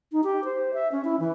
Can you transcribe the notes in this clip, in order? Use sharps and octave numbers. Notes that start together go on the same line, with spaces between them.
D#4
G4
C5
E5
C#4
E4
E3